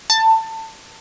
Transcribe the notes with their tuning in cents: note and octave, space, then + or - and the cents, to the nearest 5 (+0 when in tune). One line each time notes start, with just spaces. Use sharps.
A5 +20